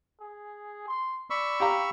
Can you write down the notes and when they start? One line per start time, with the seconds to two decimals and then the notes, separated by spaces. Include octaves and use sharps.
0.20 G#4
0.88 C6
1.30 D5 B5 C#6 E6
1.60 G4 F5 A#5